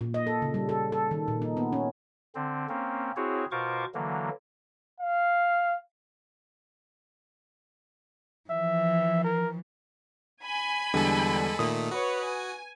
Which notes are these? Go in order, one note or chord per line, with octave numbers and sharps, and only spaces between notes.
A#2
D#5
A4
C#3
G3
A4
A4
D#3
A#2
D#4
B3
C#4
D3 C4
A#3 C4 C#4
C4 E4 F#4 G#4 C#5
B2 F4 A#4 C5 C#6 D6
D3 E3 F#3 A#3
F5
E3 F3 E5
A#4
G#5 B5
E2 D3 G3 G#3 A4
A#2 D#3 A3 D#6
F#4 B4 C#5
G#5